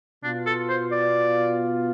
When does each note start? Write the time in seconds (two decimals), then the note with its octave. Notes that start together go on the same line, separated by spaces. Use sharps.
0.23 B2 B3 D4 F4
0.46 A4
0.69 C5
0.92 D5